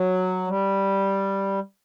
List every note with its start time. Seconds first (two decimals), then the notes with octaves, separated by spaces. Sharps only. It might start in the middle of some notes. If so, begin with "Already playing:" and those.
Already playing: F#3
0.47 G3